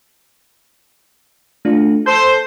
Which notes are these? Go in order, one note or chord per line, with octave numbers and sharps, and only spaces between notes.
A3 D4 F4
A4 C5 G6